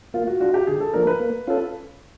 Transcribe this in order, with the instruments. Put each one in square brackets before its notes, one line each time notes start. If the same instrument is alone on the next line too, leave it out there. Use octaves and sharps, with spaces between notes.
[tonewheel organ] A#3 [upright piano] F4
[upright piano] F#4
[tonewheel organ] D4 F4 [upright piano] F#4
[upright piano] G4
[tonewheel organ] D3 [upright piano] G#4
[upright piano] A4
[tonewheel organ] F3 A#3 D4 [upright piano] A#4
[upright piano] B4
[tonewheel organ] A#3
C#4 F4 A4